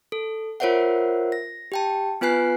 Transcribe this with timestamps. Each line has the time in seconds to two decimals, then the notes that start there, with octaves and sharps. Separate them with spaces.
0.12 A4
0.60 F4 A#4 C5 C#5 E5 F#5
1.32 A#6
1.72 G4 G5 A5
2.21 B3 F4 B4 G#5 F#6 C7